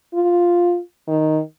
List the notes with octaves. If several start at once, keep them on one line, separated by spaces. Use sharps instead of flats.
F4
D#3